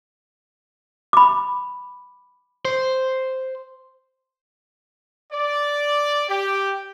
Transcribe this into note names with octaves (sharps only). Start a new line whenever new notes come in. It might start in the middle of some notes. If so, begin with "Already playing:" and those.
B5 D6
C5
D5
G4